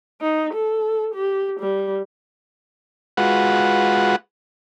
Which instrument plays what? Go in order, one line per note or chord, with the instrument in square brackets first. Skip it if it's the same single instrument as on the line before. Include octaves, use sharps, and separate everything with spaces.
[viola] D#4
A4
G4
G3
[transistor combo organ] G#3 F4 F#4 B4 F#5